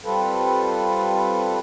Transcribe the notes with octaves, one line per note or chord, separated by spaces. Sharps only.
G3 C4 F4 A4 B4